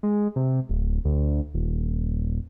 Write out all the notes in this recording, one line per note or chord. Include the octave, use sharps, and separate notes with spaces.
G#3
C3
D1
D2
D#1